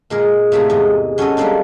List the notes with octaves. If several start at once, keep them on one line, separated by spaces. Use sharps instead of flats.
A#2 G#3 G#4 A#4
A2 C3 A3 A#3 E4 G#4
E2 G#2 D#5
F#3 C#4 F#4 A4 C#5 D#5
G3 G#3 A#3 C4 D4 D#4